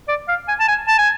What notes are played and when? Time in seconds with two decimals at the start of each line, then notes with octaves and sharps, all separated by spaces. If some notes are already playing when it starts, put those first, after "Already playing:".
0.08 D5
0.28 F5
0.48 G#5
0.59 A5
0.68 G#5
0.88 A5
0.98 G#5